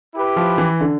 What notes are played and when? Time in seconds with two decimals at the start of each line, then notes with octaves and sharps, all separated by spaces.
0.13 E4 G4 B4
0.36 F3
0.58 E3
0.81 D3